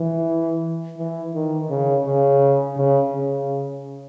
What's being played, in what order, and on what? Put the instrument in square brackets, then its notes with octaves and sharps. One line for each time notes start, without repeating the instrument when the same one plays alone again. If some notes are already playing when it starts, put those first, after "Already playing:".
Already playing: [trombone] E3
E3
D#3
C#3
C#3
C#3
C#3